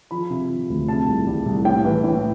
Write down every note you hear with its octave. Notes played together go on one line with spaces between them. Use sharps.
F3 B5
C3
F3
D2
C3 A5
C2
G3
C2
A2 G5
E3
A2